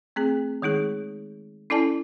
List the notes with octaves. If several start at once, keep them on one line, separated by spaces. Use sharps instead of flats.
A3 C4 G#4
D#3 G#3 D#4 G#4
C#4 E4 A4 D5 G#5 A5